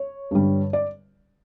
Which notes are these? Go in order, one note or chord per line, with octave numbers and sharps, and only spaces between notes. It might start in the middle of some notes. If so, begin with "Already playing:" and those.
Already playing: C#5
G2 D3 G3
D5